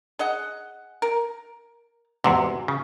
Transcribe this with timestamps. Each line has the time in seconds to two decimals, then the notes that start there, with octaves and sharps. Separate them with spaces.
0.19 G#4 D#5 F#5
1.02 A#4
2.24 E2 G#2 C3 F#4
2.68 C#3